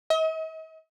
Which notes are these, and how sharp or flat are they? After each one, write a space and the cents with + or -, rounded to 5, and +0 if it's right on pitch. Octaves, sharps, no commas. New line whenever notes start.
D#5 +45